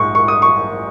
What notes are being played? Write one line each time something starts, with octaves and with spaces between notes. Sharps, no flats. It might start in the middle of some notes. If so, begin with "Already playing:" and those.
Already playing: A#1 G#2 C#6
C#6
D#6
C#6